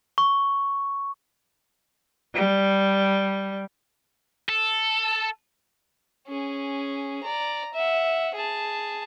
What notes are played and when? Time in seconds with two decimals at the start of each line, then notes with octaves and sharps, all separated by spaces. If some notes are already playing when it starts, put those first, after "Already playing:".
0.18 C#6
2.34 G3
4.49 A4
6.27 C#4 G#4
7.23 D5 A#5
7.74 E5 F#5
8.35 G#4 A5